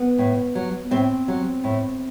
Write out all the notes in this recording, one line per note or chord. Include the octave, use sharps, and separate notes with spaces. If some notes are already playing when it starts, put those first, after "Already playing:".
Already playing: B3
A2
F#3
A2 C4
F#3
A2